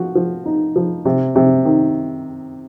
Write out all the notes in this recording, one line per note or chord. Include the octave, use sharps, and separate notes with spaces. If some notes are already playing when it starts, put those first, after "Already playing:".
Already playing: F3 F#4
F3
D#4
F3
C3
C3
D#3